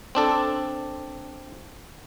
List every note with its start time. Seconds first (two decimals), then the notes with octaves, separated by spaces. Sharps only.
0.15 C4 D4 A4